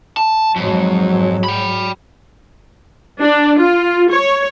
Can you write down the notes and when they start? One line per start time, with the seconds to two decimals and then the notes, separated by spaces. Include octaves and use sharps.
0.17 A5
0.56 F2 G#2 F#3
1.44 G5 B5
3.21 D4
3.59 F4
4.11 C#5